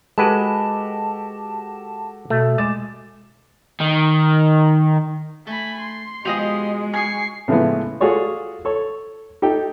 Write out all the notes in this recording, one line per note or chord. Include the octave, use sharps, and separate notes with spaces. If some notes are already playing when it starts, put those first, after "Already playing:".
G#3 F#4 G4 A4 B4 A5
B2 A3
G#3 D6 A6 E7
D#3
A3 G#5 B5
C6
B2 F3 G#3 G4 G#4 D#5
G#5 C#6 D#6 C7
A2 C#3 E3 F3 G#3 B3
F4 F#4 G#4 A4 C#5 D5
A4 C#5
D#4 G4 A4 G5